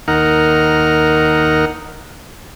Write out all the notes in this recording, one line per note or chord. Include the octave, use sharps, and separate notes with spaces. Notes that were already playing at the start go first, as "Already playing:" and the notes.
D#2 D#4 A#4 F#5 F6